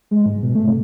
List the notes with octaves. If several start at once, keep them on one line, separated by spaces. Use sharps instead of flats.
G#3
G#2
B2
A3
C3